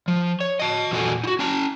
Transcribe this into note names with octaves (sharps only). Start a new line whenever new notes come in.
F3
C#5
D#5 A5
E2 A#2 F#4 A4 G#5
D#4 F#4
C#4 A5 A#5